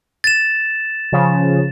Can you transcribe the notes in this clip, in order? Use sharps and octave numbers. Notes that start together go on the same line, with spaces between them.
A6 E7
C#3 F3